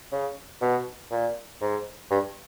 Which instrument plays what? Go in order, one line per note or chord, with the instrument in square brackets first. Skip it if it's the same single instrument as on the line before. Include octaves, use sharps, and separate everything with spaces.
[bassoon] C#3
B2
A#2
G#2
G2